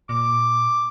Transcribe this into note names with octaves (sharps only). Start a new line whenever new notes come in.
A#2 D6